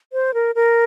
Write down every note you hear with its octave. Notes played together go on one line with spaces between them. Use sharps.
C5
A#4
A#4